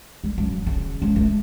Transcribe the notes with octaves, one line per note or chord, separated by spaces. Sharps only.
G3
F#2
C#3
C#2
A3